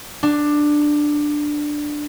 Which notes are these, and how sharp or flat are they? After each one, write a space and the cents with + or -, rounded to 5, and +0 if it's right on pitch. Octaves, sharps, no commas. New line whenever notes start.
D4 +10